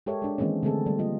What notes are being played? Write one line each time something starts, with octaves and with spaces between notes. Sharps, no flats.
G#3 G4 A4 A#4 C#5 E5
G#3 D4
D#3 E3 G#3 A#3 C4 C#4
D3 G#3 A3 C4 G#4 A4
D3 G3 A3
G3 A#3 F4 D#5